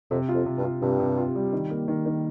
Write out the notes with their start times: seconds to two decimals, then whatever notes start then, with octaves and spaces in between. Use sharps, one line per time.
0.11 F2 C3
0.29 F4
0.34 F2
0.46 C3
0.58 G2
0.64 F4
0.82 G2 C3
1.00 C3
1.17 F4
1.35 G3
1.53 D#3
1.70 A#3
1.88 D#3
2.06 D#3